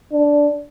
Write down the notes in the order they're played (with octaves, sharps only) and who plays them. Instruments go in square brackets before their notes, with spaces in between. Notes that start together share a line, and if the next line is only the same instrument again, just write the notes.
[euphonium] D4